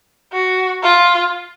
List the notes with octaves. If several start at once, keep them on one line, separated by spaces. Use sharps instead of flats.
F#4
F4